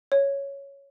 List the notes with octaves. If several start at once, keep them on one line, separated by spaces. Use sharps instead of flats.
C#5